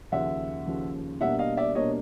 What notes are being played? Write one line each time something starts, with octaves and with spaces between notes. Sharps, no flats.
D#2 C#3 F3 E5 F#5
D#2 C#3 F3
B2 G3 A#3 D4 E5 F#5
D#5 F5
D5 E5
B2 G3 A#3 D4 C#5 D#5